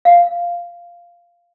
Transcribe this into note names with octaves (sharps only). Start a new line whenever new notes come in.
F5